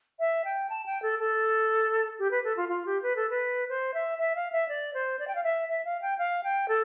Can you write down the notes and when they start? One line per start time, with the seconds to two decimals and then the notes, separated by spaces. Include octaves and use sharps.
0.19 E5
0.44 G5
0.69 A5
0.85 G5
1.02 A4
1.19 A4
2.18 G4
2.30 B4
2.44 A4
2.56 F4
2.68 F4
2.85 G4
3.02 B4
3.15 A4
3.29 B4
3.69 C5
3.93 E5
4.18 E5
4.35 F5
4.52 E5
4.68 D5
4.93 C5
5.19 D5
5.27 G5
5.35 F5
5.43 E5
5.68 E5
5.84 F5
6.01 G5
6.18 F5
6.43 G5
6.68 A4